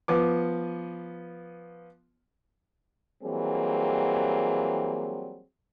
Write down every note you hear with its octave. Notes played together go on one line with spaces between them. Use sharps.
F3 B3 D6
E3 F#3 G3 A#3 C4 G#4